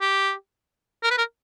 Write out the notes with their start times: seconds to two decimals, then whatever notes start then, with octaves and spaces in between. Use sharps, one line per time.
0.01 G4
1.03 A#4
1.11 B4
1.18 A#4